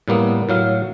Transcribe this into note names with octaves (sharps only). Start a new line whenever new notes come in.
A2 G3 A#3 B3
A2 F#3 F5